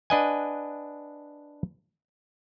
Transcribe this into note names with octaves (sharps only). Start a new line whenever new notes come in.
D4 B4 D#5 F#5 G#5